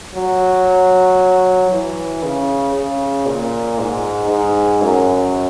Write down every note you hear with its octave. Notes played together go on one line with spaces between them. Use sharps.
F#3
E3
C#3
C#3
A#2
G#2
G#2
F#2